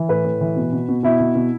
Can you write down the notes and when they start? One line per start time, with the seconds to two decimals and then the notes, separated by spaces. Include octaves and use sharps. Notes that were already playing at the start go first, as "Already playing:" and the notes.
Already playing: E3
0.09 A2 B4
0.25 A2
0.41 E3
0.56 B2
0.73 B2
0.89 B2
1.03 B2 E4
1.20 B2
1.35 B2